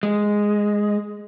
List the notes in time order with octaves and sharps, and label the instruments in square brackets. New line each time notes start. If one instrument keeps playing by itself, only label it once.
[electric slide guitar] G#3